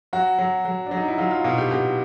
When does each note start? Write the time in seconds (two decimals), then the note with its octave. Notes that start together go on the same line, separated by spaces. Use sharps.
0.13 F#3 F#4
0.39 F#3
0.65 F#3
0.86 D4
0.91 F#3
0.97 D#4
1.08 E4
1.18 F#3 F4
1.31 F4
1.44 B2 F4
1.58 G4
1.71 B2 G4